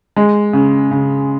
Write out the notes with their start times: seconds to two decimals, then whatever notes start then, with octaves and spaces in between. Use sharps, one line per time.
0.16 G#3
0.53 C#3
0.91 C#3